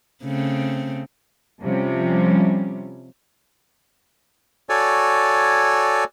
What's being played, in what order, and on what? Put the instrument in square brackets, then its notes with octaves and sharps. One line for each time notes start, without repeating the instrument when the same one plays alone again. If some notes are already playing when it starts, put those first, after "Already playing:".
[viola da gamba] C#3 A3 C4
[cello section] C3 F3 G3 C#4
[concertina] F#4 A4 C#5 D5 G#5